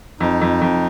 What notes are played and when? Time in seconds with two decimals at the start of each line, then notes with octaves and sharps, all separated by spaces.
0.20 F2 D#4
0.41 F2
0.61 F2